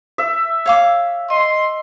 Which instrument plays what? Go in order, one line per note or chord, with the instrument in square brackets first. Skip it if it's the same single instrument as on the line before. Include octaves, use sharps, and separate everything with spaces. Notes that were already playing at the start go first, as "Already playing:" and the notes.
[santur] E5
[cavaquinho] C#5 F5 D6
[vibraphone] D#5 [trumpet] C6